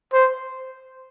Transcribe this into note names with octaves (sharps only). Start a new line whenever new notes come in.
C5